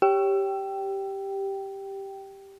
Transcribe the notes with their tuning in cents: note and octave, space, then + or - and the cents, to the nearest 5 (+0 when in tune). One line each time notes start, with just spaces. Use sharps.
G4 +0 G5 -10